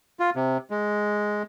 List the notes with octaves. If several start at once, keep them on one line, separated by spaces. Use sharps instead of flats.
F4
C3
G#3